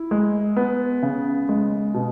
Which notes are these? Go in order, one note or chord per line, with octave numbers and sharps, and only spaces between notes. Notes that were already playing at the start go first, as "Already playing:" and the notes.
Already playing: E4
G#3
B3
C#3
G#3
B2